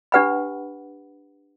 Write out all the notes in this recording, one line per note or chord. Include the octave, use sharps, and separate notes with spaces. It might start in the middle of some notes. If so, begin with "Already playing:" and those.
D4 G4 B4 F#5 B5